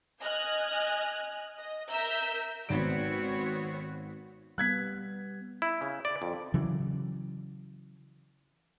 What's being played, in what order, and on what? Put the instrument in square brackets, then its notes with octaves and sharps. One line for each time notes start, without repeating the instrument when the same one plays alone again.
[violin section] D#5 G#5 F6 F#6
D#5
A#4 E5 A#5 E6 G6
[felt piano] G#1 D7 [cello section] B3 C4 C#5 [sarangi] F#4
[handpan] G3 B3 [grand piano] F#6 G#6 B6
[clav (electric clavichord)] E4
C#3
D5
F2
[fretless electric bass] C#3 E3 F#3